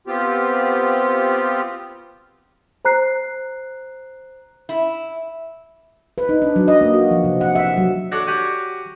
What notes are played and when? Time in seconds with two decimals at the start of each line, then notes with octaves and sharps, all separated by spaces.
0.07 B3 C4 F4 G4
2.85 C5 A#5 F#6 C7
4.69 E4
6.18 B4
6.29 D#4
6.42 D4
6.56 F#3
6.68 D#5
6.81 A#3
6.94 F#4
7.11 F3
7.24 C3
7.41 F#5
7.55 E5
7.77 F#3
8.12 D4 F#4 A4 C#5
8.27 F#4 G4 C#5 G#5